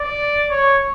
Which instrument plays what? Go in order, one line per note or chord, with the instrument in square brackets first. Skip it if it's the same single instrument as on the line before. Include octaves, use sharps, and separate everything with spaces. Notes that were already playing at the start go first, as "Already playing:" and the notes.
Already playing: [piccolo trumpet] D5
C#5